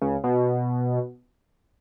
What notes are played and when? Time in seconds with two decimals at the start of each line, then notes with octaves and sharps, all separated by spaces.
0.02 C#2 C#3
0.24 B2